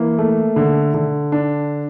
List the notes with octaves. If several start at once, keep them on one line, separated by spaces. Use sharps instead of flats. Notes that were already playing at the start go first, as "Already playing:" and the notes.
Already playing: E3 A#3
A3
D3
D3
D4